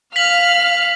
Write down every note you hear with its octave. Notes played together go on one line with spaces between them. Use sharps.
F5 F6 B6 F#7